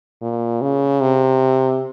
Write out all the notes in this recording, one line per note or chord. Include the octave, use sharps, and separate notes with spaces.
A#2
C#3
C3